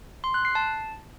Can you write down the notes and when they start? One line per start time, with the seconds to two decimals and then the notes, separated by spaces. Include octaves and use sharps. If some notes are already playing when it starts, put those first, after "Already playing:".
0.24 C6
0.34 F#6
0.45 C7
0.55 A5